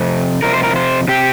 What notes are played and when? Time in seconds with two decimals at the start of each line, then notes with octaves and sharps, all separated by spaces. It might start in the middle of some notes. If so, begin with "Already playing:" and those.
Already playing: F2 C3
0.42 F2 C3 A#4
0.53 C5
0.63 A#4
0.76 C5
1.08 C3 G4